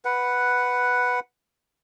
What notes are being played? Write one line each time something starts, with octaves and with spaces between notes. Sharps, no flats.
B4 F#5